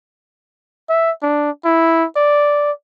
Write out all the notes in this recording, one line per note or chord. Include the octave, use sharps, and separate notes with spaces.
E5
D4
E4
D5